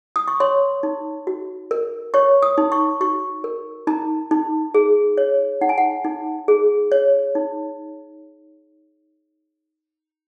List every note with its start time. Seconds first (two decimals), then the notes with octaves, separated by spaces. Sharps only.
0.16 D#6
0.28 C#6
0.40 C#5 C6
0.83 D#4
1.27 F#4
1.71 A#4
2.14 C#5 C#6
2.42 D#6
2.58 D#4
2.72 C#6
3.01 F#4 C#6
3.44 A#4
3.87 D#4 A#5
4.31 D#4
4.74 G#4
5.18 C#5
5.61 D#4 F#5
5.69 G#5
5.78 F#5
6.04 D#4
6.48 G#4
6.92 C#5
7.35 D#4